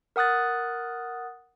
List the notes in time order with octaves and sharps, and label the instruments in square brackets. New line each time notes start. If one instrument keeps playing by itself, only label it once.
[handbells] A#4 F#5 D#6 F#6 A6